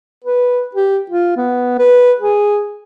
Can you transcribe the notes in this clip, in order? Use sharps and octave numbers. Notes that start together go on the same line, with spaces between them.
B4
G4
F4
B3
B4
G#4